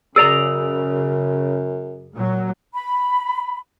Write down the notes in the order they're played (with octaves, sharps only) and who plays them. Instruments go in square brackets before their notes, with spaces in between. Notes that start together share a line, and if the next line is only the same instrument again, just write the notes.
[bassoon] F#2 [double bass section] C#3 [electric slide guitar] G#4 D5 A#5 [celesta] E6
[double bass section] A#2 F#3
[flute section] B5